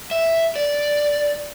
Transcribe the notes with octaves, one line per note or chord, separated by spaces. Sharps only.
E5
D5